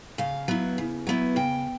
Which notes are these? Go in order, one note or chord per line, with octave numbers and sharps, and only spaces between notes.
C#3 F5
F#3 B3 E4
C#3
F#3 B3 E4
C#3 G5